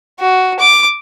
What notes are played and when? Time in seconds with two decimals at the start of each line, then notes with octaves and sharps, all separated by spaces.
0.19 F#4
0.60 D6